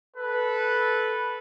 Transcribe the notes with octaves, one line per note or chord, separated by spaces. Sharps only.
A4 B4